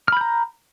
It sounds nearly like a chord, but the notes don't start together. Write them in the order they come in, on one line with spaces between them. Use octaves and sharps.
F6 B5 G6 A#5